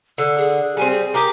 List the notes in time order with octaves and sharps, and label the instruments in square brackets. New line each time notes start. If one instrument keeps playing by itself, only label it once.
[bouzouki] D3 [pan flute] E6
[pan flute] G#4
[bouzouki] G3 C4 [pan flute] G#5
[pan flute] G#4
[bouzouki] G4 G#4 A#4 [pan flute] D6